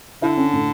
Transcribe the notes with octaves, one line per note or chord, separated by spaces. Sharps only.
D3 E4
C#4
A2